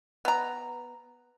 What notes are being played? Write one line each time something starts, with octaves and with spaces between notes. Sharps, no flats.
B3 A#5